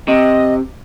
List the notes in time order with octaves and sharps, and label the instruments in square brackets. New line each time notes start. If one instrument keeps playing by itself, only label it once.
[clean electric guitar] C3 [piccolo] D#5